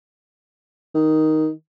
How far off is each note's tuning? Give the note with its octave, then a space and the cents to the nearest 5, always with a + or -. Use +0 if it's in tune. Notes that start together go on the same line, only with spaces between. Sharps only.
D#3 +5